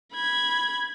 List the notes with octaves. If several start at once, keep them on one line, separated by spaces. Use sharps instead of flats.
B5 G#6